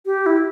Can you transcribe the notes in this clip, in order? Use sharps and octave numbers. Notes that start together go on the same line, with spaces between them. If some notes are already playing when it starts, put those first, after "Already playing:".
G4
E4